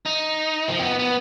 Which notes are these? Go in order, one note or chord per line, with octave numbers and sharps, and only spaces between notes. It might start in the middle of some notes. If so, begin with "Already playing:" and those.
D#4
F3
C4
B3
B3